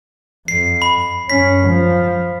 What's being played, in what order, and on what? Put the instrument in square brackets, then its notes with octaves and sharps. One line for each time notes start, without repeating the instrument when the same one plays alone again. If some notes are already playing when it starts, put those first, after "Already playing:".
[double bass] F2 [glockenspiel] C7
[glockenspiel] B5
[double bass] F#2 C#4 [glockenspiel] B6
[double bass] F3